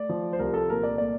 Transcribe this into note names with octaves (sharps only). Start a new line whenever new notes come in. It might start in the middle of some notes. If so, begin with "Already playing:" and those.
Already playing: A3 D5
F3
C5
C2 A#4
A4
A#2 A#4
D5
A#3 D5